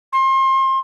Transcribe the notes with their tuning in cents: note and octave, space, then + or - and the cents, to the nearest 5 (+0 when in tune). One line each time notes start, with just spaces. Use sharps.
C6 +35